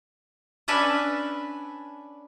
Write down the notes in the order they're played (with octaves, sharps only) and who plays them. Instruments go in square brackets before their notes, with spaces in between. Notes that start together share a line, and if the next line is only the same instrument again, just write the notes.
[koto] C#4 D4 B4 E5